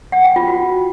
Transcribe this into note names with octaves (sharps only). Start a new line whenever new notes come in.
F#5
G5
F4
F#4